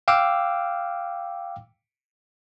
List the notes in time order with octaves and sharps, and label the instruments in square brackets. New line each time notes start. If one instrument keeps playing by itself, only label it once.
[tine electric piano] F5 G5 D6 E6 F6